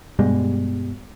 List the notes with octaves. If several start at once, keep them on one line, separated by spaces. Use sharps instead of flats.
G2 B2 G3 G#3